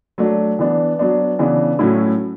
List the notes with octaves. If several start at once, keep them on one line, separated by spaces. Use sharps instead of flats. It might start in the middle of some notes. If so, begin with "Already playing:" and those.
F#3 A3 D4
E3 B3 D4
F#3 B3 D4
C#3 E3 B3 D4
A2 F#3 C#4 E4